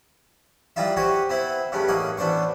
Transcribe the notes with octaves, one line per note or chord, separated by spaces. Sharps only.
E3 G3 D#4 F4 E5
F#4 G4 C5 C#5 G#5
B3 C4 E4
G2 C#3 A3 B3
A1 A#3 C#5 D#5 F#5
A1 B3 D4 C5 C#6